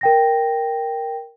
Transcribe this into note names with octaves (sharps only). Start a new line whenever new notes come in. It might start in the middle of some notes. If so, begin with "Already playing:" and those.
A#4 G5 A#6